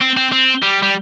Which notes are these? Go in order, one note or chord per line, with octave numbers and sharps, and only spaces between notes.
C4
C4
C4
G3
G3